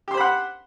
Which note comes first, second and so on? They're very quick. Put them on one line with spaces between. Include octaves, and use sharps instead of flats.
G4 C6 C5 B5 F#5